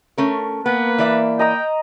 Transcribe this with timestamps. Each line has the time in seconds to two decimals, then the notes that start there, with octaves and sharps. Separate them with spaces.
0.18 A3 C#4 A#4
0.66 A#3 B3 B4
0.98 E3 D5 E5
1.39 D#5 G5 A#5 D#6